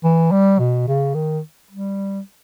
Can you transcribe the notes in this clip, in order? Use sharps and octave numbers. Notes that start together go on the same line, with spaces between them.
E3
G3
B2
C#3
D#3
G3